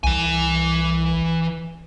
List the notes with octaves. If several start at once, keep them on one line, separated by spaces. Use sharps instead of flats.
C2 E3 G#5